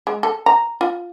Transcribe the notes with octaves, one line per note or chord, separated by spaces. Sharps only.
G#3
A4
A#5
F4